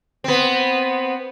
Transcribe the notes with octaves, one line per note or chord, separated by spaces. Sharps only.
B3 C4